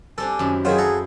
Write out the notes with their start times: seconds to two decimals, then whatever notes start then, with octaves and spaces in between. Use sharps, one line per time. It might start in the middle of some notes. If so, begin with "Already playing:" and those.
0.18 G3 C4 D4 A4 G#5
0.39 F#2 D#3 E4
0.65 D#3 F#3 E4 F4 G#4 C5
0.78 A4 F#5 A#5